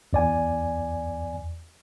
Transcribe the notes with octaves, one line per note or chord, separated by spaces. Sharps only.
E2 D5 G#5